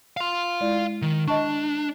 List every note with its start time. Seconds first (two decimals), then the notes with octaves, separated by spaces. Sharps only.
0.17 F5 C6
0.61 G#3 E4 D5
1.02 D#3
1.28 D4 D#5 A5 C#6